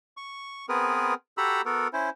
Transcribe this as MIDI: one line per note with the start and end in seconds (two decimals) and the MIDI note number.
0.17 0.66 85
0.69 1.14 59
0.69 1.14 60
0.69 1.14 68
0.69 1.14 70
0.69 1.14 71
1.38 1.61 66
1.38 1.61 67
1.38 1.61 69
1.38 1.61 82
1.38 1.61 83
1.38 1.61 88
1.65 1.88 59
1.65 1.88 66
1.65 1.88 69
1.65 1.88 70
1.93 2.10 61
1.93 2.10 64
1.93 2.10 72